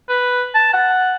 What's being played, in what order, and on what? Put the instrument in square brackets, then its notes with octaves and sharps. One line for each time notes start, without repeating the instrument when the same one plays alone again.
[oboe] B4
A5
F#5